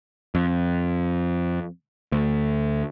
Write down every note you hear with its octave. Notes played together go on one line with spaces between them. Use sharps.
F2
D2